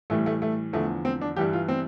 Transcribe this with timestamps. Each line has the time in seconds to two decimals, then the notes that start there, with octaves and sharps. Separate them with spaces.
0.10 A2 E3 G3 A3
0.26 A3
0.42 A3
0.73 E2 D3 F3 A3
1.05 C4
1.21 D4
1.37 G2 E3 G3 G4
1.53 F4
1.69 C4